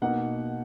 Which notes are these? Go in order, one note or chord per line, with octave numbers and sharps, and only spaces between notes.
B2 A#3 D#4 F#5